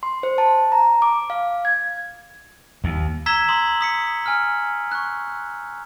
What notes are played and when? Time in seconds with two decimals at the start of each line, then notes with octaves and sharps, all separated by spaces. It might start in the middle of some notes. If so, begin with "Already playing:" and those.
0.03 C6
0.23 C5
0.38 A5
0.72 A#5
1.02 D6
1.30 F5
1.65 G#6
2.84 D#2
3.26 A#5 E6 G#6 B6 E7 G7
3.49 A#5 C6 D#6 F#7
3.81 D#6 B6 C#7
4.26 G#5 F6
4.91 C#6 F#6